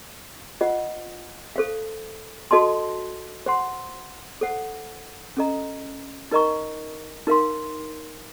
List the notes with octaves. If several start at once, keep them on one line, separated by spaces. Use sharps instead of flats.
F4 C5 D#5 F#5
A4 C5 F5
F#4 A4 D#5 A5 C6
C5 F#5 C6
A4 C5 F#5
C#4 A4 D#5 A#5
D#4 A#4 D#5 A#5 C#6
D#4 A#4 F5 C6